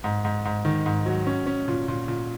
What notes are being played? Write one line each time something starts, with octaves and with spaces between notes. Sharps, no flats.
G#2
G#2
G#2
D#3
G#2
F#3
C#4
C#4
A#2
A#2
A#2